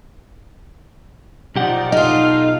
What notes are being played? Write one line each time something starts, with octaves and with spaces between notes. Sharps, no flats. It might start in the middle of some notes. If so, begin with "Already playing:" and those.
B1 F3 D#4 G4 D5 F#5
D#4 F4 A4 D#5 F5